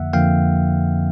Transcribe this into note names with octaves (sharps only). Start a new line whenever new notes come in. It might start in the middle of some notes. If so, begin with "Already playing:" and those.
Already playing: F2 D3 F3 A#3 E5 F#5
F2 D3 F3 A#3 F5 G5